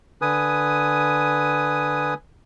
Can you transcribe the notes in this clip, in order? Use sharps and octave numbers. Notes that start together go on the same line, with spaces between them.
D3 B4 G#5 D#6